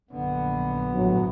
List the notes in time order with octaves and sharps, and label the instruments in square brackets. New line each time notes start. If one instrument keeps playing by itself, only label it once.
[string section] A#1 F#2 [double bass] D3 [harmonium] B3
[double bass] A1 [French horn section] D2 G2 F#3